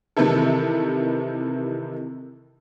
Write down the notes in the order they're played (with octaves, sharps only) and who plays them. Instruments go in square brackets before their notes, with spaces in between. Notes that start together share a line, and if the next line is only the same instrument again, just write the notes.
[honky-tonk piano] C3 D#3 E3 E4 A4